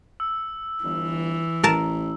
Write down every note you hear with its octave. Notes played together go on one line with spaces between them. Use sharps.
E6
G1 E3
A1 A#4 A5